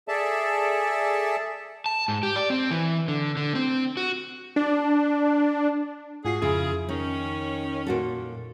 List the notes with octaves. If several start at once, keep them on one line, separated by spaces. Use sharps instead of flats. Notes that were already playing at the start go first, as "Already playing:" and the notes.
G#4 A4 D5 E5 A5
A5
G#2
G4
D5
C4
E3
D3
D3
C4
F#4
D4
G#2 F4 F#4 G#4 C7
F2 C#3 E4 F4 G#4
D#3 C#4 D#4
A#2 F#4 A4